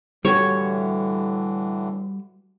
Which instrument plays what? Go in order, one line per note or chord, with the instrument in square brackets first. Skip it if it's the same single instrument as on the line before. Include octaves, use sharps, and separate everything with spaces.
[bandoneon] A2 D3 E3 [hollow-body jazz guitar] G3 F#4 G4 [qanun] C#5